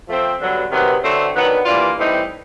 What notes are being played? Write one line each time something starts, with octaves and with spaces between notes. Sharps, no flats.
F3 A3 C4
G2 D3 F#3 B3
C3 D#3 F#3 B3
D3 F#3 A3 C4
D#3 F#3 B3 D4
E3 G3 A#3 D4 F4
A2 E3 G3 C4 D#4